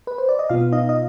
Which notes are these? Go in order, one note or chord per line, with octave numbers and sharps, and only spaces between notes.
B4
C5
D5
D#5
B2 B3 F4 F5
D#4 D#5
D#5